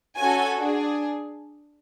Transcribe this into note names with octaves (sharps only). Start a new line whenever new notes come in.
C#4 F#4 A4 G#5
D4 G#4